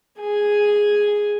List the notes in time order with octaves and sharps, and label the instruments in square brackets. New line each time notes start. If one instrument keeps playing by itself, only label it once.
[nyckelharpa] G#4 G#5